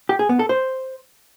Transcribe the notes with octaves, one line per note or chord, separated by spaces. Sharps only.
G4
G#4
B3
A4
C5